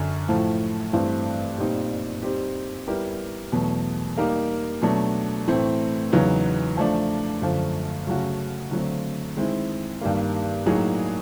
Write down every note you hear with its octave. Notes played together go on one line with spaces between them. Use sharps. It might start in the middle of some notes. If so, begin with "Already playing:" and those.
Already playing: F#2 D3 F#3
A2 F3 A3
G2 E3 A3 C4
A#2 G3 C4 D#4 G4
G3 C4 D#4 G4
G3 B3 E4 G4 A#4
E2 B2 F#3 A3
G3 A#3 D#4 G4 A#4
B2 F#3 A3 D4
A2 E3 A3 C4
E2 C#3 F#3 B3 D#4
F3 A3 D4
F#2 D3 F3 A3
C#3 F#3 A3 C#4 F#4
D3 F#3 A3 C4
D#3 G#3 C4 E4
G2 D#3 G3 A#3
A2 F#3 A#3 D#4 G#4